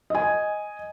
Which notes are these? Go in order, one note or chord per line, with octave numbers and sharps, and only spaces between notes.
D#5 G#5